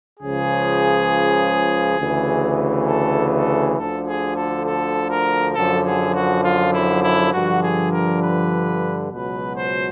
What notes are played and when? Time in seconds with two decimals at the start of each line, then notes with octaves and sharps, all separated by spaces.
0.20 C#2 C#3 F3 G#4
1.98 D2 C#3 E3
2.88 A4
3.32 A4
3.77 D2 D3 F3 A4
4.07 G#4
4.36 A4
4.66 A4
5.10 A#4
5.55 F#2 D3 F3 A4
5.85 G#4
6.15 F#4
6.45 F4
6.74 E4
7.04 E4
7.33 G2 D3 F3 F#4
7.63 G#4
7.93 A#4
8.23 B4
9.11 C#2 B2 F#3 B4
9.57 C5